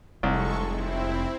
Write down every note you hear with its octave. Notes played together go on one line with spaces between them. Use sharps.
F1 C2 G#3 A4 C#6
C4 E4